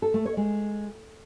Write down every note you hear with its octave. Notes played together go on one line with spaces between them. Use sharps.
A4
A3
C#5
G#3